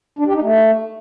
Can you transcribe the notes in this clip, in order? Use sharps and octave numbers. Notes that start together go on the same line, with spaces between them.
D4
G4
D#4
A3